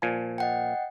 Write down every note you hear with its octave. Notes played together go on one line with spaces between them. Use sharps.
A#2 F3 G#5
D#5 F#5 G5